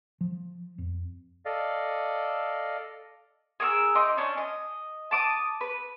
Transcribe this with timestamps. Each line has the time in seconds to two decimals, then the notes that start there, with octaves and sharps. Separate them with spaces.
0.21 F3
0.78 F2
1.45 A4 D5 D#5 F5
3.60 G#4 A#4 C#6 E6
3.95 D#4 C6 D6
4.17 C#4 D4
4.38 D#5
5.11 A5 D6 D#6
5.61 B4